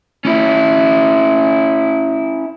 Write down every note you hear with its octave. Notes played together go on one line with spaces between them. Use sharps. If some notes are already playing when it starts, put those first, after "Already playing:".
C#4 E4